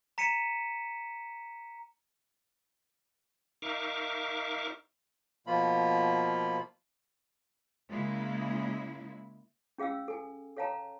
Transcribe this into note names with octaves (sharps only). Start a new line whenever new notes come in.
A#5 B6 C#7 D#7 E7
D#4 A#4 E5 F5 C#6 D6
B2 F3 A#3 F4 B5
C#3 G#3 A#3 E4
C#4 G#4 F5 G5 E6
A4 G#5
A4 C#5 F5 G5 A5 A#5